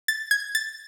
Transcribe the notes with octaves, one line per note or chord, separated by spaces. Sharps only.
A6
G#6
A6